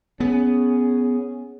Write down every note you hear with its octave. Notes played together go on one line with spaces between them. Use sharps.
B3 C#4 G#4